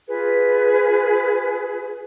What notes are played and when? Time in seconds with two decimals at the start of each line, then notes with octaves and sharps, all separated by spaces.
0.09 F4 G#4 B4